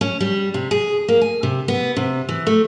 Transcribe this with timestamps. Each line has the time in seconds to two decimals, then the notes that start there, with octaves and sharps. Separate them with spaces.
0.01 C#4
0.20 G3
0.54 C3
0.71 G#4
1.08 A#3
1.21 G#5
1.43 C3
1.68 B3
1.96 C3
2.29 E3
2.47 A3